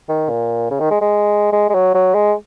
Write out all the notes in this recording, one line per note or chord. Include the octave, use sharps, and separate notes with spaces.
D#3
A#2
C#3
D#3
G#3
G#3
G#3
G#3
F#3
F#3
G#3